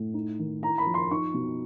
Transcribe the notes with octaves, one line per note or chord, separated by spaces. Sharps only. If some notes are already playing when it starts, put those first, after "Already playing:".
Already playing: A2
D#4
D#3
E4 A#5
B5
F3
C6
D#4 C#6
B2